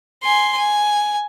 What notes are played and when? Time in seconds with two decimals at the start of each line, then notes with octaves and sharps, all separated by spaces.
0.23 G#5 C6
0.57 G#5